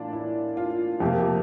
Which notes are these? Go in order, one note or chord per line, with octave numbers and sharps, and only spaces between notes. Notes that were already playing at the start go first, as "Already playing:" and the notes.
Already playing: A2 E3 A#3 D4 F4
E4
F4
F2 C3 F3 A#3 G4
G4